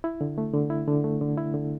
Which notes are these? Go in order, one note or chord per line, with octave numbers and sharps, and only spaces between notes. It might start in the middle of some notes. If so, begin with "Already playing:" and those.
E4
D3
A3
D3
E4
D3
A3
D3
E4
D3